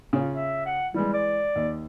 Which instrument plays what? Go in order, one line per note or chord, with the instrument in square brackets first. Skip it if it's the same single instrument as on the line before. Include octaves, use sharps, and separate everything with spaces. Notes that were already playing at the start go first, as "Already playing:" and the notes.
[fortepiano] C#3 C#4 F4
[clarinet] E5
F#5
[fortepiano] E3 G#3 [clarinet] G3
[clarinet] D5
[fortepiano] D#2